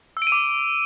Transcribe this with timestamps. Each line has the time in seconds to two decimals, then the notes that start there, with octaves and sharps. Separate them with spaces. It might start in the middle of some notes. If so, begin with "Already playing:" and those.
0.17 E6
0.22 D7
0.27 D#7
0.32 D6